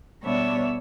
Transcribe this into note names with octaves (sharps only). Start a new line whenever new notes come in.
B2 G3 B3 D4 C#5 E5